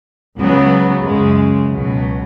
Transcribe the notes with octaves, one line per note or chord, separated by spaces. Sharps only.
C#2 C#3 F#3 B3
F#2 C#3 G#3
C#2 B2 F#3